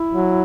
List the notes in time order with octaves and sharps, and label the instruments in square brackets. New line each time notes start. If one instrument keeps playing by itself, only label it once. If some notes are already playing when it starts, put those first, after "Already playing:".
Already playing: [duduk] E4
[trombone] F#3